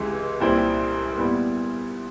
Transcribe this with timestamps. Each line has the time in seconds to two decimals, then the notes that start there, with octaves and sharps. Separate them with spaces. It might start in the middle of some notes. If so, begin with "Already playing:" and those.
Already playing: C#2 C3 E3 G#3
0.41 C2 A#2 G3 C4 E4
1.17 A#2 G3 B3 E4